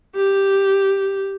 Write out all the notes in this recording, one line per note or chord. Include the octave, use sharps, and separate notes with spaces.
G4